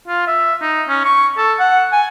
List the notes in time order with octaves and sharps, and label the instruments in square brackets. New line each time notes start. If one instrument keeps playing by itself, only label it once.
[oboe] F4
E5
D#4
C#4
C#6
A4
F#5
G#5